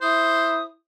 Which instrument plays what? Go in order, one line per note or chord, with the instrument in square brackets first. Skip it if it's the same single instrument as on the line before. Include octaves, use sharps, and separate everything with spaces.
[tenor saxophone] E4 [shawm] C5 [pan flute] D#6